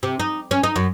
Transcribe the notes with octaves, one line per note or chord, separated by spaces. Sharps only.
C3
D#4
C#4
D#4
F#2